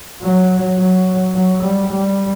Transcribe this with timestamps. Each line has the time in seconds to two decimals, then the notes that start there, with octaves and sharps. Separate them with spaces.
0.22 F#3
0.78 F#3
1.35 F#3
1.63 G3
1.91 G3